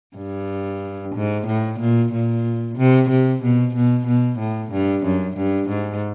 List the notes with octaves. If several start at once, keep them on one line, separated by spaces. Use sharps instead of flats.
G2
G#2
A2
A#2
A#2
C3
C3
B2
B2
B2
A2
G2
F#2
G2
G#2